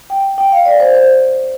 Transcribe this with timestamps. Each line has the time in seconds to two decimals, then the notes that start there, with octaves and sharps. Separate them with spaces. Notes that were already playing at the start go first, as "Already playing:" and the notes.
0.10 G5
0.38 G5
0.52 F5
0.66 D5
0.80 C5
0.95 C5